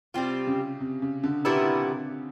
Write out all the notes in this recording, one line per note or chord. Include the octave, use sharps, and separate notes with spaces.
C3 G3 C4 F4
C#3
C3
C#3
D3
A#2 G3 B3 E4